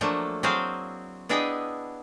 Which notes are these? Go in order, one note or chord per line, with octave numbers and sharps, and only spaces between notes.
F3 F#3 A3 A#3 D4
F#3 C4 E4 G#4 C5 F5
B3 D4 E4 G#4 D#5 G5